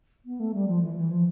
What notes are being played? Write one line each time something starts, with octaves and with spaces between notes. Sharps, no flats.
B3
A3
G3
F3
E3
F3
E3
F3